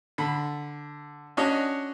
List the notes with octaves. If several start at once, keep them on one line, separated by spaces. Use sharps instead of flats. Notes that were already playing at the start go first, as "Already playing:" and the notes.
D3 B5
C#4 D4 F#4 C#5 D#5